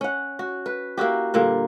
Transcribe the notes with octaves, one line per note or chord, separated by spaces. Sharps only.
C#4 F#5
F#4
B4
A#3 E4 F#4 G4
A#2 D3 G3 A#3